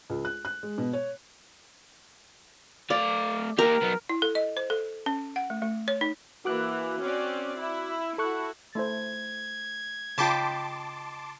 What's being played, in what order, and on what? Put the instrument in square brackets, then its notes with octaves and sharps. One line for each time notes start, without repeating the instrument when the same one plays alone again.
[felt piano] C#2
F#6
F#6
G#3
B2
C#5
[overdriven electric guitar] A3 F5 [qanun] D5
[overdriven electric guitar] A#3 G4 [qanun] A#4
[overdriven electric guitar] F#3 B3
[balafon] E4
A4
D#5
C5
A4
C#4
F#5
A3
A3
C#5
D#4
[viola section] E3 A#3 [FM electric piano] F#4 D6 F#6
[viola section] C4 C#4 D5
E4
[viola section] E4 F#4 [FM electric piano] A4 C#6 F#6
[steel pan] A3 E4 C5 [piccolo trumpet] G#6
[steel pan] C#3 F4 [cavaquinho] D#5 G5 B5 [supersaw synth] A5 C6 D6